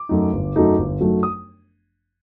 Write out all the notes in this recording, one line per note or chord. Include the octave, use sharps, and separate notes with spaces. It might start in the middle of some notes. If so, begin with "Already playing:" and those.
Already playing: D6
F#2 F#3 A3 D#4
G1
F#2 F#3 A3 D#4
G1
F#2 F#3 A3 D#4
D#6